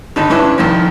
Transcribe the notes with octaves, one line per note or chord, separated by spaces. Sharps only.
G#1 D3 D#4 A5 B5
G2 C#4 D4 E4 B4 A5
C2 F2 D#3 F3